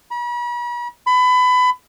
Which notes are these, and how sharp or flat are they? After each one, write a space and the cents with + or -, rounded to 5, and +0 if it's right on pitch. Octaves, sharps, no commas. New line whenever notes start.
B5 -45
B5 +25